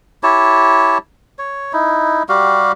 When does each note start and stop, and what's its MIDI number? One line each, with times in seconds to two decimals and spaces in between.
0.23 0.98 64
0.23 0.98 67
0.23 0.98 73
0.23 0.98 81
1.39 1.73 73
1.73 2.23 63
1.73 2.23 64
2.29 2.72 55
2.29 2.72 66
2.29 2.72 67
2.29 2.72 77